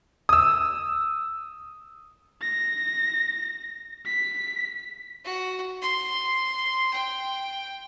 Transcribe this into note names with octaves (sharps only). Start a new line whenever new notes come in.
D#6 E6
A#6
B6
F#4
C6
G5